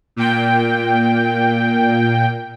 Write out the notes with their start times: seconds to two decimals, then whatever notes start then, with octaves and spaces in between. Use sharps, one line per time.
0.16 A#2 G5